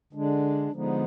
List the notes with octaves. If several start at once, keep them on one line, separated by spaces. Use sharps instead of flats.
D3 G#3 D4
D3 F3 G#3 B3 D#4